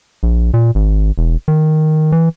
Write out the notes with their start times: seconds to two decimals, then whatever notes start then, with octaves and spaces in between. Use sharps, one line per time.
0.23 A#1
0.54 A#2
0.75 G#1
1.18 E1
1.48 D#3
2.12 E3